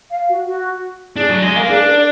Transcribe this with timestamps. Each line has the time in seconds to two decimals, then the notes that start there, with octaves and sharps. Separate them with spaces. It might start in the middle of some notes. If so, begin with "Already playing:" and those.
0.10 F5
0.28 F#4
0.46 F#4
1.16 D4 G#4
1.29 F#3
1.42 G#3 G#4
1.56 A#3 A#4
1.69 D4 G#4
1.82 A#4
1.96 D5